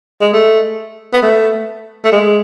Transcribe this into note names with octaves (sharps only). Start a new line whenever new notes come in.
G#3
A3
B3
A3
A3
G#3